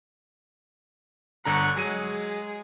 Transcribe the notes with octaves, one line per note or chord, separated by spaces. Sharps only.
G1 D3 F#5 A#5 C#6
F#3 G#3 G#4 D#7